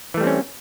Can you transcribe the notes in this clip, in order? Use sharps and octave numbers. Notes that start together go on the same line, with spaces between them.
E3 G3 A3 C4 C#4